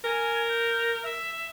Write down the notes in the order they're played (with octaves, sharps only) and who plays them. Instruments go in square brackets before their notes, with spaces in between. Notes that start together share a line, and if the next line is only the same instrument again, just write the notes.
[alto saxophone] A#4 [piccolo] G#5
[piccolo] G6
E5